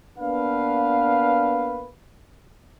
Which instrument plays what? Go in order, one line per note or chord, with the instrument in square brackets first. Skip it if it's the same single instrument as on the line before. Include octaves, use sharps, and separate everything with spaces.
[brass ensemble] A#3 B3 D4 B4 F5